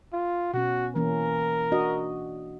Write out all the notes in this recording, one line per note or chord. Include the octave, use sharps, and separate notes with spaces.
F4
B2 C#4 F#4
E3 A#3 C#4 A#4
D4 F#4 D#5